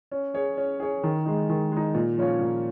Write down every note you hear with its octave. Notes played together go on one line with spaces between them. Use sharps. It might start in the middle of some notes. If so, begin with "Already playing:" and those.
C#4
G#4 C#5
C#4
G#4 C#5
D#3
G#3 D#4
D#3
G#3 D#4
A#2
F3 C#4 F4 C#5
A#2